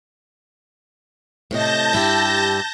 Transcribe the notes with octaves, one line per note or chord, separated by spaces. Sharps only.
A2 C3 D#5 A5 G6 A#6
G2 E4 G4